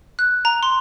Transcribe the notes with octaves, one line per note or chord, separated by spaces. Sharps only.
F#6
A#5
C6